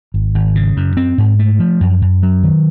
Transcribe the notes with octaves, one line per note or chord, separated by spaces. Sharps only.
G#1
G#1
C#3
F#2
C4
G#2
A3
F3
F#2
F#2
F#3
D#3